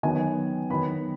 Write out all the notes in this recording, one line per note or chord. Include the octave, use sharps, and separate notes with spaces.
D#3 F#3 B3 G#5
D#3 F#3 B3 B5